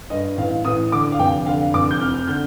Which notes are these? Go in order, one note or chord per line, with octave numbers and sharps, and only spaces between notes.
G2 D#5
A1 F5
A1 D#6
D3 D6
F5
F1 G5
D3 F5
F1 D6
G6
F2 F6
D3 G6